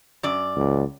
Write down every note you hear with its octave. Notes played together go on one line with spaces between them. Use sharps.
F#2 D5
C#2